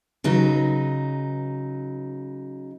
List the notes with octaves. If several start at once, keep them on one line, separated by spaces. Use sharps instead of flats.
C#3 F#3 D#4 B4